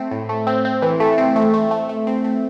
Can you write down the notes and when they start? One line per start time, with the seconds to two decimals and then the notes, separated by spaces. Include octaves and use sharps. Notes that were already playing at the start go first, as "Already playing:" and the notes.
Already playing: A3 C4
0.11 A2
0.29 A3
0.47 C4
0.65 C4
0.82 E3
1.00 A3
1.18 C4
1.36 A3
1.54 A3
1.71 A3
1.89 A3
2.07 C4
2.24 A3